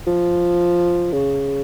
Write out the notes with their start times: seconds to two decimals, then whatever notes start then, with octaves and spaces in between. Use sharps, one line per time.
0.07 F3
1.12 C#3